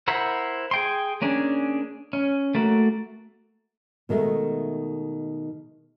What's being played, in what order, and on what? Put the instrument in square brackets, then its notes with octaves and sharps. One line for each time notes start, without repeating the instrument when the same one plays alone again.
[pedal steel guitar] E4 A#4 C5 F#5 B5
G#4 G5 C6
A#3 C#4 D4 G#4
C#4
A3 A#3 F#4
[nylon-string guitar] B2 D#3 G#3 A3